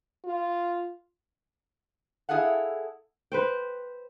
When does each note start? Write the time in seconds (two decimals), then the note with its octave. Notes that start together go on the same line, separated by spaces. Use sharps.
0.25 F4
2.29 E4 G#4 A4 F5 F#5
3.32 B4 C5 G5